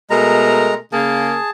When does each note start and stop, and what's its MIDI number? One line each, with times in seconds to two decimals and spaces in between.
0.10 0.77 47
0.10 0.74 56
0.10 0.77 57
0.10 0.77 70
0.10 0.74 82
0.93 1.35 49
0.93 1.35 58
0.93 1.51 68
0.93 1.51 81